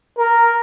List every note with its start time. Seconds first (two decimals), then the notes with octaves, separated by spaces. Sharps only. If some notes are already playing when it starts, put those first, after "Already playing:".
0.18 A#4